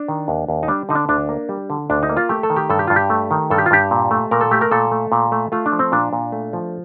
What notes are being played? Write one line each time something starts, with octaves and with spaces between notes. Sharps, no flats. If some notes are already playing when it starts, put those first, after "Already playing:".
Already playing: D4
D#3
D#2
D#2
D#4
G3 D4
D3 D#4
D4
D2 D4
A#3
G3
D3
D2 D4
D#4
A#3
F4
A3 G4
A4
D#3
G4
G2 A4
G4
G2 F4
G4
A3
D#3
G2 A4
G4
F4
G2 G4
A#2
A3
A#2 A#4
A4
A3 G4
A#4
A#2 A4
A3
A#2
A3
A3 F4
D4
F3
C4
A#2 D4
A#2
A3
F3